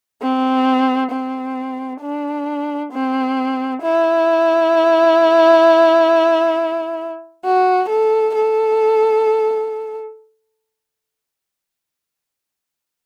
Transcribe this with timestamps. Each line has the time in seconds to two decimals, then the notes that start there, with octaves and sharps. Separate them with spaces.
0.22 C4
1.11 C4
2.01 D4
2.92 C4
3.82 E4
7.44 F#4
7.89 A4
8.35 A4